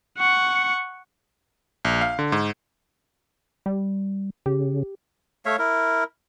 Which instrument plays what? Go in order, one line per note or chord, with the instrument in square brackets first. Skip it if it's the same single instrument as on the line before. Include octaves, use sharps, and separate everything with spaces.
[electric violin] F#5 C#6
[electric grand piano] A#1
F5
D3
G#2
[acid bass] G3
[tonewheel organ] C#3 [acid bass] G4
[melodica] A3 C#5 E5 F5
E4 A#4